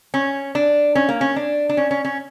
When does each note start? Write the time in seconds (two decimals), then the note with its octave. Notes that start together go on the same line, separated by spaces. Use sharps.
0.14 C#4
0.55 D4
0.95 C#4
1.09 A#3
1.21 C#4
1.36 D4
1.69 D4
1.77 C#4
1.91 C#4
2.05 C#4